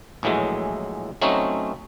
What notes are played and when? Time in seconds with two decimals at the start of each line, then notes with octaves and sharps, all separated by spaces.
0.23 A#1 A2 E3 F#3 G#3
1.22 F#3 A3 C4 C#4 D#4